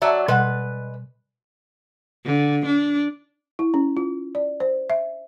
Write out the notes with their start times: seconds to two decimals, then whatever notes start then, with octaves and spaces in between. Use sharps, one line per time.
0.02 F#3 D5 E5 A5 A#5
0.28 B2 G3 G#3 B4 F#5
2.25 D3
2.66 D4
3.59 E4
3.74 C#4
3.97 F4
4.35 D5
4.60 C5
4.90 E5